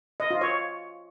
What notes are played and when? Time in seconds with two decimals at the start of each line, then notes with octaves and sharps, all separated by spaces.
0.20 D#5
0.31 F4
0.41 C#5